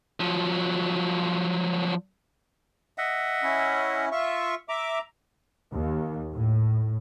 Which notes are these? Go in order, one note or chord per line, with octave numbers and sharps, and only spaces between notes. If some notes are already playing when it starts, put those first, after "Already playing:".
F3 F#3
D#5 E5 F#5
C#4 E4
F4 E5 C#6
E5 A#5 D6
D#2
A2